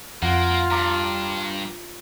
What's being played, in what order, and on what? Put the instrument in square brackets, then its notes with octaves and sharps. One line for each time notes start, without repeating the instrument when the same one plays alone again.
[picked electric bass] F2 [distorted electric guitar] A#3 [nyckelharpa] F4 [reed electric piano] F#5
[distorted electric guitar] G2 [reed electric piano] A#5 D6